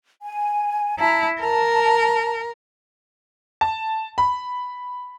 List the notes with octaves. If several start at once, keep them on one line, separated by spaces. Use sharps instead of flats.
G#5
E4 A5 A#5
A#4 A5
A5
B5